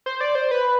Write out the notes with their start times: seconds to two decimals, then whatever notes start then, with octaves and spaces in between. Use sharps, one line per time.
0.06 C5
0.21 D5
0.35 C5
0.51 B4